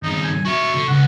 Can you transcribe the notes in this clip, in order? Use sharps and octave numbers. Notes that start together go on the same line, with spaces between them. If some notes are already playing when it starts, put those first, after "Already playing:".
G2 D#3 D#4
G#5
F#4 E5 C#6
D3
C#2 F#5